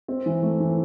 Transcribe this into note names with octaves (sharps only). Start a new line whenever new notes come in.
C4
E3
A3
E3